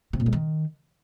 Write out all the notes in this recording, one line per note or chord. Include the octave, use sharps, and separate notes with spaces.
C3
A#2
G#3
D#3